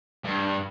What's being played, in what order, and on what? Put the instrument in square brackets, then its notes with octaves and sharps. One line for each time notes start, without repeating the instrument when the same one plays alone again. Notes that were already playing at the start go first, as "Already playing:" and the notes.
[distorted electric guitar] G2